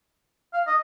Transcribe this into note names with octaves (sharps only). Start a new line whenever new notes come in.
F5
D#5